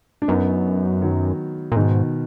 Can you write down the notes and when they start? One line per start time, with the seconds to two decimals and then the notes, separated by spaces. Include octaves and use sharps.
0.22 D4
0.28 F#2 B3 D#4
1.02 D#3 F#3
1.72 A#2
1.76 G#2 B2 D#3